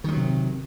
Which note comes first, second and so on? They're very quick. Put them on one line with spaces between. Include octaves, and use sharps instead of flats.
D#3 G3 F#3 C3